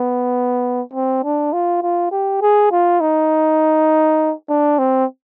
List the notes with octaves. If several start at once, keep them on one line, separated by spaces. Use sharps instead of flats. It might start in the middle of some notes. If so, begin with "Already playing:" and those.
Already playing: B3
C4
D4
F4
F4
G4
G#4
F4
D#4
D4
C4